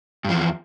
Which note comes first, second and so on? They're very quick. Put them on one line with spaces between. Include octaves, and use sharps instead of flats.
G2 F3 E2